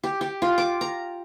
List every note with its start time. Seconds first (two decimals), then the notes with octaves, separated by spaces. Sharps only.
0.04 G4
0.21 G4
0.42 F4
0.58 D6
0.81 A#5